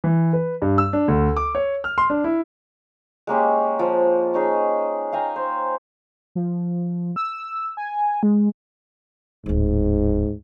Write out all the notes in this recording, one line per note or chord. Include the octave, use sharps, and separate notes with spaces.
E3
B4
G2
E6
D4
D2
D6
C#5
F6
C6
D4
E4
G#3 A#3 C#4 G4
F3
C#4 D#4 G#4
F5 G5 G#5 A#5
C5
F3
E6
G#5
G#3
D1 G1 G#2